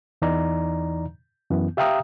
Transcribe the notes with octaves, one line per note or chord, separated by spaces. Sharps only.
E2 E3 D#4 D5 A#5
F#2 E3 B3
G4 E5 F5 G5 A#5 D#6